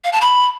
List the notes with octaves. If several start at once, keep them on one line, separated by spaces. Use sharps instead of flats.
F5
A5
B5